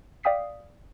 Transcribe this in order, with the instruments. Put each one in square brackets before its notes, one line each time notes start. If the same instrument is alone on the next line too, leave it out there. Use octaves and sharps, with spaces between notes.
[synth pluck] D5 F5 G5 D#6 B6 C7